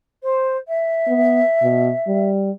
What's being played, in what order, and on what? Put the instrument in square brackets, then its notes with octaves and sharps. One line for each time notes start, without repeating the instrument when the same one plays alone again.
[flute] C5
E5
[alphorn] B3
B2
G3